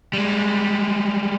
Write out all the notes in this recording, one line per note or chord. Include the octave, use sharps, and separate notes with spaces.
G3 G#3